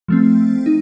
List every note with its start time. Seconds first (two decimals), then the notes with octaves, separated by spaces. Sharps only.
0.08 F3 A3 C4
0.66 D#4